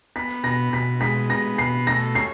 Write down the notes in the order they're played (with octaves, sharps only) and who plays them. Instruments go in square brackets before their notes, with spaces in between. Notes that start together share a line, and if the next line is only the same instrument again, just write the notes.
[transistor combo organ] B3 [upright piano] B6
[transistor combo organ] B2 [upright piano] A#6
[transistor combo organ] B2 [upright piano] B6
[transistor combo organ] G#3 [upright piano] B6
[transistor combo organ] B3 [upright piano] A#6
[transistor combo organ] B2 [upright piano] C7
[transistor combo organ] A3 [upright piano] A#6
[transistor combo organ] C#4 [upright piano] C7